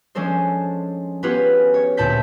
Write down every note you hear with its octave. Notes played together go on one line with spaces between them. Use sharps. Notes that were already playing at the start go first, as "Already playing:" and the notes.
F3 G#3 C#4 D4 A4 C5
B3 C#4 F4 G4 G#4 B4
C#5
D2 A#2 A5 B5 G6 B6